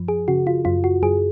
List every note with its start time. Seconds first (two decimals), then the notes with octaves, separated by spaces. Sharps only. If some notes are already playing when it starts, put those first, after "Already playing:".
Already playing: F#2 F3
0.08 G#4
0.28 C#3 F#4
0.47 F4
0.65 F#2 F4
0.84 F#4
1.03 F#2 G#4